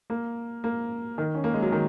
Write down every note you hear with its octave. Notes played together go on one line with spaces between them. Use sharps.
A#3
A#3
D#3
C#4
A#3
G#3
F#3
D#3